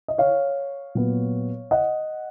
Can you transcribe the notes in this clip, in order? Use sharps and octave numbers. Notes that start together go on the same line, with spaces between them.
D#5
C#5 F5
A#2 F#3 B3
D#5 F#5